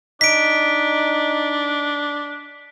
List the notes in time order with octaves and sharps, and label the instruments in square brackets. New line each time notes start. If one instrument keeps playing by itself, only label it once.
[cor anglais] D4 [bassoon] D#4 [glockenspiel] B6 D7